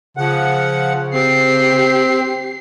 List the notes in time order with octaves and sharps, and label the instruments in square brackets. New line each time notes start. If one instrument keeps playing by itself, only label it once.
[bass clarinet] C#3 [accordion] F3 F#5
[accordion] C4 [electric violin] G4 C7